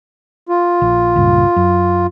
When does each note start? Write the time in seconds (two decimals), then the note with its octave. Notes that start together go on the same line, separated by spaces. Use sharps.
0.49 F4
0.81 A#1
1.16 C#2 G2 A#2
1.56 F#2